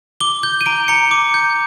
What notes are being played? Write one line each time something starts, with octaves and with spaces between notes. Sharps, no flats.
D6 G7
G6 G7
D#7
A#5 D7
A#5 C#7
D6
G6